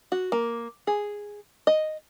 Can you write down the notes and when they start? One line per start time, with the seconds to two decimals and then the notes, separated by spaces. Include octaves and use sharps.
0.12 F#4
0.32 A#3
0.87 G#4
1.67 D#5